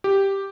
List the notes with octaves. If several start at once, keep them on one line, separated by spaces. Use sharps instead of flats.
G4